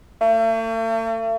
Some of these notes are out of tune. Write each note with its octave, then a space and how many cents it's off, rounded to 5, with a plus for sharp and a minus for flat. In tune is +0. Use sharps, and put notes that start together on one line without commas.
A3 +45